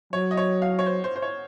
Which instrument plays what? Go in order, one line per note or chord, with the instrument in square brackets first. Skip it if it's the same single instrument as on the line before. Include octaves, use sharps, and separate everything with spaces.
[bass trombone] F#3 [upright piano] C#5
[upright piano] D#5
C#5
F5
C#5
C5
C5
C5
C#5